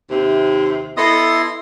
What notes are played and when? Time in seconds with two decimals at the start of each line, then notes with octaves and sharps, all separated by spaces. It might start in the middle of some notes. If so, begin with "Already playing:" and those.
0.10 D#2 C3
0.97 B3 E4 A4 D#5 C6